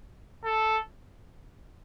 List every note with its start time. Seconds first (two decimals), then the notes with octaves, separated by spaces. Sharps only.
0.44 A4